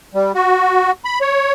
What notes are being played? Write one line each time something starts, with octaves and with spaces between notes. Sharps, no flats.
G3
F#4
B5
C#5